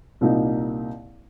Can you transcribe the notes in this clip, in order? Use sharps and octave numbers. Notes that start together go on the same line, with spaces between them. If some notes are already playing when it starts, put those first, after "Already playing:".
C2 A#2 A#3 D#4